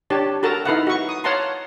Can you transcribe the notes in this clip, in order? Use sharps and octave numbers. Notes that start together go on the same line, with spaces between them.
D4 G4 C#5 A5
F#4 A4 A#4 A5 A#5
D#4 E4 A4 B4 F5 F#5
F#4 C#6
D#6
C#5 F5 F#5 A5 A#5 C6